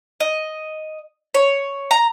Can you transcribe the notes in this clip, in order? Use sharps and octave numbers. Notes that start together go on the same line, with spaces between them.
D#5
C#5
A#5